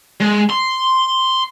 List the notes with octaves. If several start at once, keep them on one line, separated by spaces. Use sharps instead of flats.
G#3
C6